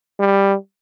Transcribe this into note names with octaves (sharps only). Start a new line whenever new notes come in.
G3